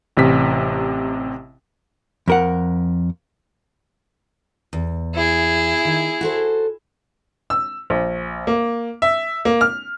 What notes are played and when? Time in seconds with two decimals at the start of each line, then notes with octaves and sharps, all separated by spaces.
0.17 A1 C3 B6
2.28 F2 A#4 F#5
4.73 E2
5.14 E4 G#4
5.85 D#3
6.21 F#4 A4 C5
7.50 E6
7.90 A#1
8.47 A#3
9.02 E5
9.45 A#3
9.61 F6